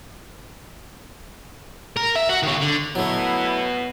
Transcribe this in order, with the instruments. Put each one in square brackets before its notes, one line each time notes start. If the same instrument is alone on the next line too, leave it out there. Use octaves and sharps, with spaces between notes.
[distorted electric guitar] A#4
E5
F#4
D#3 C#5
D3
[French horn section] B2 B3 [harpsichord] F#3 A3 [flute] E4